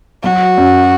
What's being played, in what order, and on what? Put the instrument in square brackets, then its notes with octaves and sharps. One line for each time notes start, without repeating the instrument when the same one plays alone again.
[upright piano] F#3 [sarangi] F#4
[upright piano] F#2